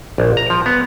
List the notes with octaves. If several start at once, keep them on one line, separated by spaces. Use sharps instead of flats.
A#1
A#5
F3
B3